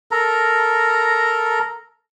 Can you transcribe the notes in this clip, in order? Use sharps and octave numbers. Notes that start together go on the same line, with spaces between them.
A4 A#4 A#5